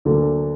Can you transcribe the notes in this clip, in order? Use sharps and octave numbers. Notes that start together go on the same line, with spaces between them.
D2 D3 F#3 A#3